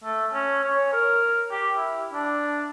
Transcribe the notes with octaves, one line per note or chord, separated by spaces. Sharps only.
A3
C#4
C#5
A#4
G4
E4
D4